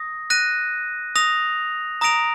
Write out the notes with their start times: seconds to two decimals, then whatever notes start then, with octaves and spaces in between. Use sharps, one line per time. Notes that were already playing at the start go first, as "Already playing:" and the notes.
Already playing: D#6 A#6
0.30 F#6 A#6 D#7
1.16 D#6 A#6 F7
2.01 A#5 D#6 A#6 D7 F7